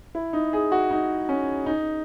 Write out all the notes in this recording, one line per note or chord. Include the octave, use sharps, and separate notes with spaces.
E4
D#4
G#4
F#4
D#4
C#4
D#4